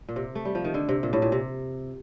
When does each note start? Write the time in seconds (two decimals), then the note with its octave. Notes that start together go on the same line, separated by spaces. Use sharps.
0.09 A#2
0.16 C3
0.35 A3
0.45 G3
0.55 F3
0.64 D#3
0.74 D3
0.89 C3
1.03 A#2
1.13 A2
1.22 A#2
1.32 C3